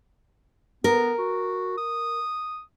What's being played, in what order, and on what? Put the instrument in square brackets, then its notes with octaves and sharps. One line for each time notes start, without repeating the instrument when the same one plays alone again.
[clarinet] B3 [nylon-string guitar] A#4
[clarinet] F#4
D#6